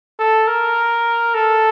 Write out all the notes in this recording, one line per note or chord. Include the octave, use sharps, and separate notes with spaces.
A4
A#4
A4